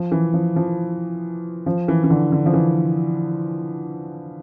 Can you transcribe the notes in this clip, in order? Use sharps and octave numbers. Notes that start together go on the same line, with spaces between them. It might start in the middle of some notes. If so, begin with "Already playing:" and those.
Already playing: F3
E3
F3
F3
F3
E3
E3
D3
D3
F3
E3